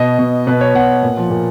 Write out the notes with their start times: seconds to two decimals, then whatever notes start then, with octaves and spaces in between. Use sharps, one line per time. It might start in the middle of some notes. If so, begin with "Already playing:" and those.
Already playing: B2 D#5
0.19 B2
0.47 B2 B4
0.61 C#5
0.75 B2 F#5
1.03 A#2
1.17 F3
1.30 A#2